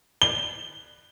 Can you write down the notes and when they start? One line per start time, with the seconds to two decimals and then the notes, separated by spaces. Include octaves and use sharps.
0.22 G7